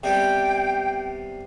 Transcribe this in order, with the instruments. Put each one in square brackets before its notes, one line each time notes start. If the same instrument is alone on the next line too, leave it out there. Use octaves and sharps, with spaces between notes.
[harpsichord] C3 G3 B3 [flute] G5